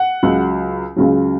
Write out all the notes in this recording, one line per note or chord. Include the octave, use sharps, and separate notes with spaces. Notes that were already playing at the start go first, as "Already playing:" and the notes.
Already playing: F#5
C#2 C#3 F#3
C#2 C#3 F#3